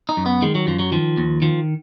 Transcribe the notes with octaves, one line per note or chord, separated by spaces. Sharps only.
D#4
F#2
B3
D#3 G#3
F#3
F#2 F3
F#3
D#3 F3
D#2
D#3 F3